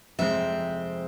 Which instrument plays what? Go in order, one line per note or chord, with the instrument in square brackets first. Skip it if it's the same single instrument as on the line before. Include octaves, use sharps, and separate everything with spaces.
[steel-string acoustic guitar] F2 C3 G#3 C4 E5